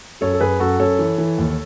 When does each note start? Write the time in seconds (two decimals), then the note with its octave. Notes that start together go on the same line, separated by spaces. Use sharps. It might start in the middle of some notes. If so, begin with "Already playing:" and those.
0.21 F#2 A4 C#5
0.33 A4
0.40 F#2 G#4 B4
0.60 F#2 F#4 A4
0.79 F#2 A4 C#5
0.99 E3
1.18 E3
1.38 D#2